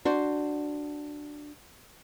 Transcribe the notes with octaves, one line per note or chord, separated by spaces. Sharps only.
D4 F#4 C5